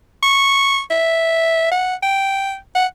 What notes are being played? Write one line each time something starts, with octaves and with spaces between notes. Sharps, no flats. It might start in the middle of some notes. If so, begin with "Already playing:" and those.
C#6
E5
F#5
G5
F#5